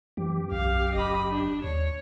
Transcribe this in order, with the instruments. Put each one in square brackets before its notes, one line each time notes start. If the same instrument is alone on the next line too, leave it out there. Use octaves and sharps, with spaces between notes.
[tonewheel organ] F#2 G4 [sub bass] E3
[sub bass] B1 [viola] F5
[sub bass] F#1 [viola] D#5 B5
[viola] D4
[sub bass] D#2 [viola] C#5